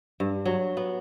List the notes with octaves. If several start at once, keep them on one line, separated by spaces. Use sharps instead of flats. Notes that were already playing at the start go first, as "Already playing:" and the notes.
G2
F#3
B3